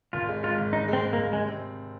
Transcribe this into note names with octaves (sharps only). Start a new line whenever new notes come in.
G#1 F4
G#3
G#2 F4
G#1
G#1 D#4
G#3 C4
G#2
A#3
G#1
C3 G#3
C4